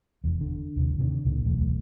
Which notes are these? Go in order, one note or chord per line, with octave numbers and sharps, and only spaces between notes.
F1 E2
D3
D#2 C3
C3 D#3 F#3 D4
C#2 A#2
D1 B1 E2 A3